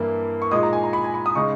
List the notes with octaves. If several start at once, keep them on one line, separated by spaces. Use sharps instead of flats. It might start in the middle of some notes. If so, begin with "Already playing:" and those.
Already playing: G2 E3 A#3 E4
C#6
A#2 G#3 D#4 D#6
A#5
G#5
A#5
B5
G#5
B5
D#6
C#3 G#3 D#4 C#6